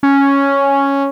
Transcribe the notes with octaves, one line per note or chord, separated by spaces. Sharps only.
C#4